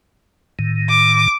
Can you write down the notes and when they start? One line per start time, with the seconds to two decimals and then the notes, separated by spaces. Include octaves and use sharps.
0.59 A2 D#3
0.89 D6